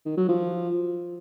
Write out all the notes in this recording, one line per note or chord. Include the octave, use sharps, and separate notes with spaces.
D#3
F#3
F3